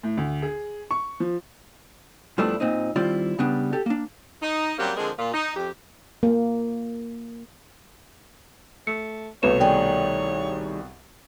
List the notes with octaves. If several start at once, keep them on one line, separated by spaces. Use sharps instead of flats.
A2
D2
G#4
C#6
F3
G2 F3 A3 B3 D4 E4
A#2 C4 D#4
D#3 G3 C4 E4 F4 D5
C#3 G3 B3 D4
G4 A4
A#3 D4
D#4
F#3 G3 A#3 C4 C#4 G4
D3 F3 G#3 C4 G#4 A#4
A#2 F4
D#4
F2 G4
A#3
A3 C#7
C2 B2 A3 B4 C#5 E7
D#3 G3 G#4 G5